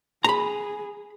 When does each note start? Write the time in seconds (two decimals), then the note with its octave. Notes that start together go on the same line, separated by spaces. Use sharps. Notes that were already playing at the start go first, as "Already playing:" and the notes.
0.24 G#4 A#5 B5